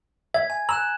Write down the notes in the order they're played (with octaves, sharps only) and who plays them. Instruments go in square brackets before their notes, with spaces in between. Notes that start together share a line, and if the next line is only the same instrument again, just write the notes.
[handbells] E5 [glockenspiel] G#6
[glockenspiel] G#5
[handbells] A#5 E6 [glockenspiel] F#6 E7 F#7